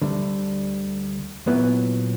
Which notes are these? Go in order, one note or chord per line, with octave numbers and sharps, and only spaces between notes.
D2 D3 G3
A#2 F#3 B3 E4